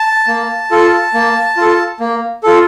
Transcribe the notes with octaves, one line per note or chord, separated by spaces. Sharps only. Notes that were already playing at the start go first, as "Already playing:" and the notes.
Already playing: A5
A#3
F4 A4
A#3
F4 A4
A#3
F4 A4